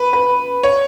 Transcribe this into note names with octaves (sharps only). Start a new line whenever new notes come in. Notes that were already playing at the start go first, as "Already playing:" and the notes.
Already playing: B4
B4
C#5